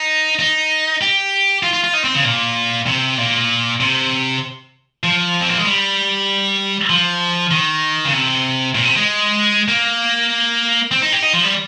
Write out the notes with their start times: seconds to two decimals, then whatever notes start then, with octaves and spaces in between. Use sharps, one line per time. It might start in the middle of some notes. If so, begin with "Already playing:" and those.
Already playing: D#4
0.39 D#4
1.01 G4
1.63 F4
1.74 F4
1.84 F4
1.93 D#4
2.04 C4
2.15 C#3
2.24 A#2
2.87 C3
3.18 A#2
3.80 C3
5.04 F3
5.41 C4
5.49 A#3
5.58 G#3
5.65 G3
6.90 F3
7.51 D#3
8.05 C#3
8.13 C3
8.75 A#2
8.85 C3
8.96 G#3
9.68 A#3
10.91 C4
11.02 D#4
11.12 G4
11.23 D#4
11.33 F3
11.44 G3